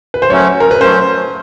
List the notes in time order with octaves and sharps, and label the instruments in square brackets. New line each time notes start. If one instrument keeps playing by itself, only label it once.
[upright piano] B4
C5
[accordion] F#3 A3 C#4 [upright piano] C#5
[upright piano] A#4
B4
[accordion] F#3 A3 C#4 [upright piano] C5